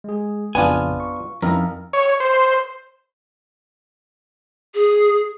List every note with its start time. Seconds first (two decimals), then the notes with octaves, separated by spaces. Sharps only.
0.04 G#3 G#4
0.55 A1 F2 C#3 B3 D4 F4 G#5
1.00 C#6
1.42 F2 C#4 D#4 E4 A#4
1.93 C#5
2.20 C5
4.74 G#4